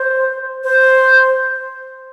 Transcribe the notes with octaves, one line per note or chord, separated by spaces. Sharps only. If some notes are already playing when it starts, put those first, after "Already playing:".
Already playing: C5
C5